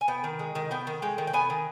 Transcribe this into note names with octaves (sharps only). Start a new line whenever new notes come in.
G#5
B3 G5
D#3
G#3
D#3
B3 G5
D#3
G#3 G5
D#3
G5
B3 G#5
D#3